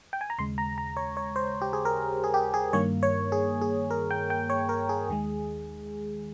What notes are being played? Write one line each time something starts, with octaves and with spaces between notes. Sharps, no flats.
G5
G#5
A#5
D#2 C#3 G#3 C6
A#5
A#5
C#5
C#5
C5
G4
G#4
A#4
G#4
G4
G#4
G2 D#3 A#3 C#5
C#5
G#4
G#4
A#4
G5
G5
C#5
A#4
G#4
D#2 D#3 G#3